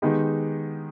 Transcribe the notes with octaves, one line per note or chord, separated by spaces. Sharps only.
D#3 G#3 B3 D#4 G4